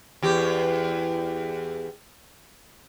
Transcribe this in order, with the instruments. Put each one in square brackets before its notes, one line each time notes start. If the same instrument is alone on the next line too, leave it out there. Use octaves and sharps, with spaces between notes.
[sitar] E2 G4